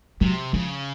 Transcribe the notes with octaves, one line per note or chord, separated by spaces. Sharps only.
C3 F#3
C#3 F3